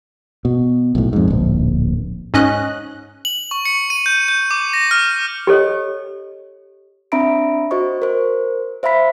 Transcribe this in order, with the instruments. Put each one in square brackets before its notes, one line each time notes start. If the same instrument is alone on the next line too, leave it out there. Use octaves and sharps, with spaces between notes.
[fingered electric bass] B2
B1 A2
F2 G#2
D1 A#1
[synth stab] G#2 C#4 D#5 F#6
[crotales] F#7
C#6
C#7
D#7
G6
G6
D6
A#6
F6
[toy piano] G4 A4 C#5 D#5
[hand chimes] C4 D4 E5 A#5 B5 D7
F#4 C5 D#5 C#6
A#4 C5
C5 E5 F5 B5 B6